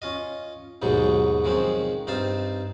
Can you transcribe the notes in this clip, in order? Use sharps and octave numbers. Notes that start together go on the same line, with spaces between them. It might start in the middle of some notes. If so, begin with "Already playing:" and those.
C#4 F4 D#5
D#2 G#2 B2 F#3 G#3
D#3 F3 G#3 C4 C#4
G2 C4 D#4 F5 A5